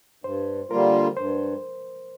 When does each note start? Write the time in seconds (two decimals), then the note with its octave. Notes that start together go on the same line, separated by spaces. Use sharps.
0.24 G2 C5
0.70 D3 G3 A#3 F4 A#4
1.17 G2 C5